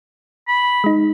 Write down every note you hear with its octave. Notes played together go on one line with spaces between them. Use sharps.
B5
G#3 D#4